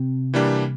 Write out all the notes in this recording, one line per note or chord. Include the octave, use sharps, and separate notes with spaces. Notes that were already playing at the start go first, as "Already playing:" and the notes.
Already playing: C3
E3 G3 A#3 D4 G4